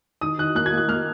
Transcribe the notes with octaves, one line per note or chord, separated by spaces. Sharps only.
D#3 D#6
D#3 F#6
A#3 F#6
G#6
A#3
F#6
A#3 F6